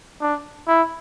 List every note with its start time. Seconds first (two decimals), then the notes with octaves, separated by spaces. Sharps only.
0.21 D4
0.68 E4